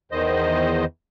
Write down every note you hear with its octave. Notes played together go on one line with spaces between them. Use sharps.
E2 D#3 C5 D#5